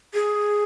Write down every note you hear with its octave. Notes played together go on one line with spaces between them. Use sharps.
G#4